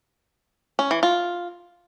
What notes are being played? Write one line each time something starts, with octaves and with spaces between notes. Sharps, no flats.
C#4
E3
F4